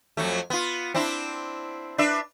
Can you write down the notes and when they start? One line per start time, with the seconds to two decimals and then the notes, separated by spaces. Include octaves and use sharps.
0.17 F2 F#3 A3
0.50 B3 F4
0.94 C4 D4 E4
1.98 D4 B4 E5